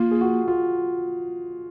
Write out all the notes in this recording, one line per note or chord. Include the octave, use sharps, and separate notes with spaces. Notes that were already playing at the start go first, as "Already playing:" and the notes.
Already playing: A#3 F4
G#4
F#4
F4